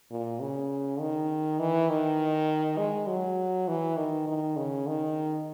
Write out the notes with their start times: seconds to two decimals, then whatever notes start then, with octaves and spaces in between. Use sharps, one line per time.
0.11 A#2
0.41 C#3
1.00 D#3
1.60 E3
1.90 D#3
2.78 G#3
3.08 F#3
3.68 E3
3.97 D#3
4.27 D#3
4.57 C#3
4.87 D#3